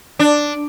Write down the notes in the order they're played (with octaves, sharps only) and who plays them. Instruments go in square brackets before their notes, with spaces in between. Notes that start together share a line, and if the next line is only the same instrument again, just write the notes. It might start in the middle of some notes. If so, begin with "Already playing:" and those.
[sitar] D4